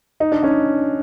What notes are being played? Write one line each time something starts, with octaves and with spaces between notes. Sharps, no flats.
D#4
D4
C#4 D#4